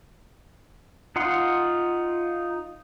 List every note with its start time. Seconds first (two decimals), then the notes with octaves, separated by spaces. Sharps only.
1.16 D#4 F4 F#5 C6